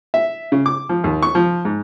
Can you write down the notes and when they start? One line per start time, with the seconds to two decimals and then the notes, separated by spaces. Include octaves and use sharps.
0.14 E5
0.52 C#3
0.66 D6
0.89 F3
1.04 D#2
1.23 C#6
1.35 F3
1.65 G#2